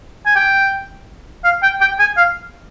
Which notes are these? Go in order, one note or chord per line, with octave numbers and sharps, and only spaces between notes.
G#5
G5
F5
G5
G5
G#5
F5